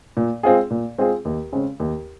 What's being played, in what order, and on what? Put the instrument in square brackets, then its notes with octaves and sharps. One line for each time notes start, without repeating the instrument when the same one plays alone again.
[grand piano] A#2
G#3 C4 F4 G#4
A#2
G#3 C4 F4 G#4
D#2
C#3 G#3 C4
D#2